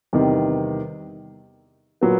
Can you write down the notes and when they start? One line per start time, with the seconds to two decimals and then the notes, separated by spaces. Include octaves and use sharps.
0.13 E2 C3 D#3 G3
2.01 A#2 F#3 B3